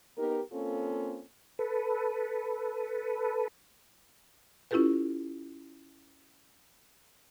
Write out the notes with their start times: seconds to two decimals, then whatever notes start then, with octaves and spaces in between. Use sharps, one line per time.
0.17 B3 D#4 G4 A#4
0.52 A#3 C4 C#4 F4 A4
1.59 A4 B4
4.71 C#4 E4 F4 G4 A4 B4